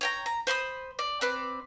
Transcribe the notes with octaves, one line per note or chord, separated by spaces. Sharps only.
C#5 G5 A#5
A#5
C5 B5 C#6 D#6
D5
C4 B4 D5